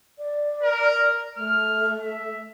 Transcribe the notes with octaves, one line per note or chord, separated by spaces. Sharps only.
D5
A#4
A3 F6
E5